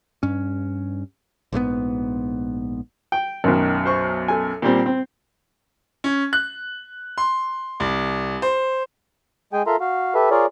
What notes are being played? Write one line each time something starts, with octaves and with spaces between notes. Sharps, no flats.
G2 C#4
A#1 G#2 B2 B3
G5
B1 F#2 D#3
C5 C#6
A4 G#5
A#2 G3 C4
C4
C#4
F#6
C6
C2
C5
G#3 G#4 G5 G#5
F4 A4 A#4 E5 A#5 C6
F#4 F5
G4 A4 B4 E5
F4 G#4 A#4 C#5 D5